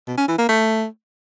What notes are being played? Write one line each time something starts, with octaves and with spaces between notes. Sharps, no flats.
B2
C#4
E3
A#3
A3